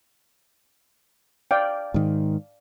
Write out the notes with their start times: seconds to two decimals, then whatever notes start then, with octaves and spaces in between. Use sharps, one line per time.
1.51 D5 F5 G5
1.94 G#2 D#3